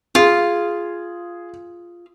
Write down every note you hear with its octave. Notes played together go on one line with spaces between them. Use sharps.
F4 G#4